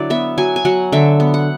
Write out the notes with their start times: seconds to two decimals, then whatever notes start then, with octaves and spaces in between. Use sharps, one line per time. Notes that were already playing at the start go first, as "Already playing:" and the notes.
Already playing: D3 F#3 D4 E4 D5
0.10 B3 E5
0.38 F#3 G#5
0.56 G#5
0.65 F#3 F#5
0.92 D3 E5
1.20 B3
1.34 F#5